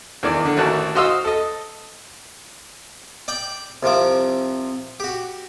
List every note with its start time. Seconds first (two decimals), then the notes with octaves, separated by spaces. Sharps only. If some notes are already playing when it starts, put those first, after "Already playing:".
0.23 E2 D#3 D5
0.45 D3
0.57 A1 D#3 F#4 A5 F#6
0.95 F#4 C5 D#5 F5 D#6 E6
1.25 A4 D#5
3.28 D5 G5 D6
3.83 C2 C3 F3 D6
5.00 F#4 G4